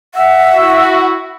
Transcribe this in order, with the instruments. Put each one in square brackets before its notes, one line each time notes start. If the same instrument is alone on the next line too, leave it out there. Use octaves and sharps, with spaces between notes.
[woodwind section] E5 [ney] F#5
[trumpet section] E4 F#4